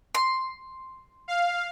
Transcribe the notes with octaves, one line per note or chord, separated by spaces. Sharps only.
C6
F5